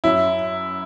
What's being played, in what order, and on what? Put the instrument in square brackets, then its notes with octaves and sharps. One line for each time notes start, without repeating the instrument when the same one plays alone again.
[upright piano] F#2 F#3 E4